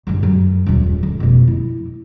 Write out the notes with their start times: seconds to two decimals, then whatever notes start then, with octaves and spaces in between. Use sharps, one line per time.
0.07 F#1 G2
0.23 F#2
0.66 D#1 C#2
1.03 D3
1.20 F1 B2
1.48 E4